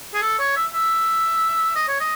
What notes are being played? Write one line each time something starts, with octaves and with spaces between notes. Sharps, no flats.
G#4
A4
C#5
E5
E5
D#5
C#5
D#5